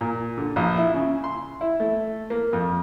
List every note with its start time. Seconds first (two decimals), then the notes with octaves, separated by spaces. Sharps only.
0.01 A#2
0.38 D3
0.56 A#1
0.77 E4
0.94 C#3
1.24 C6
1.61 E4
1.80 A3
2.30 A#3
2.53 F2